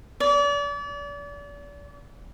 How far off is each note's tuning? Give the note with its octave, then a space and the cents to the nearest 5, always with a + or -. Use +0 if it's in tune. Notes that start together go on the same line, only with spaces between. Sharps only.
D5 -35